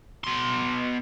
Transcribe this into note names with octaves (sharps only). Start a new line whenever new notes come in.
B2 C6